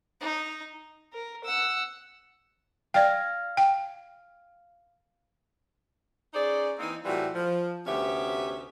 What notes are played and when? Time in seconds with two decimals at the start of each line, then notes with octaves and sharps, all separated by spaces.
0.21 D#4
1.13 A#4
1.45 F#5 E6
2.94 D5 F5 G5 G#6 A#6
3.57 G5
6.34 C#4 D#4 G#4 C5 D5
6.78 E3 A#3 C4 D#4
7.05 A2 E3 G3 C4 F4 F#4
7.34 F3
7.86 D2 C3 B3 C#4 G4 E5